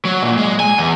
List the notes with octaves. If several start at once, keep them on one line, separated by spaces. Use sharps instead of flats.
F#3
A#2
G#3
G#5
E2